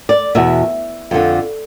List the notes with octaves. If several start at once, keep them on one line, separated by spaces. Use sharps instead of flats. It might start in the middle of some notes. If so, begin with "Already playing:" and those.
D5
E2 B2 E5
F2 D3 F3